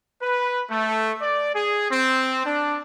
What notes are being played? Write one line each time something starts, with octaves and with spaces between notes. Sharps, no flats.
B4
A3
D5
G#4
C4
D4